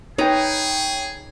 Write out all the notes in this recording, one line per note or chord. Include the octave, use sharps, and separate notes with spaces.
D#4 G#4 B4 C#5 G5 A#5